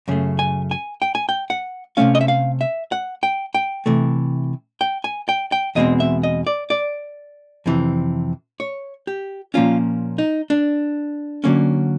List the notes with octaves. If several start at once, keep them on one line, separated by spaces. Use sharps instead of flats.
F#2 C#3 A3
G#5
G#5
G5
G#5
G5
F#5
C3 E3 A3 C#4 F5
D#5
E5
F5
E5
F#5
G5
G5
C3 E3 A3
G5
G#5
G5
G5
E2 B2 G#3 C4 D#5
E5
D#5
D5
D5
F2 C3 E3
C#5
G4
A#2 F3 A#3 C#4 F4
D#4
D4
D3 F#3 A#3 C#4